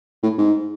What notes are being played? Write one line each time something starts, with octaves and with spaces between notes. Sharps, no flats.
A2
G#2